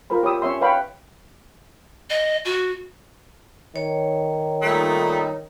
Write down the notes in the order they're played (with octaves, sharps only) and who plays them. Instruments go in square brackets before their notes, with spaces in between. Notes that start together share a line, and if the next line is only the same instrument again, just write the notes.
[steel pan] F4 A#4 C5 B5
G4 C#5 B5 D#6 E6
C#4 C#5 E5 C6
B4 C#5 F5 G5 B5
[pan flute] D#5
F#4
[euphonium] D#3 [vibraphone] C#5
[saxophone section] A#2 A3 [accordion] G3 D#4